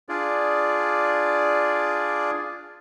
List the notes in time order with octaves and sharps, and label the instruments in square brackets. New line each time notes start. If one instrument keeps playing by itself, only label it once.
[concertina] D4 F4 G#4 D5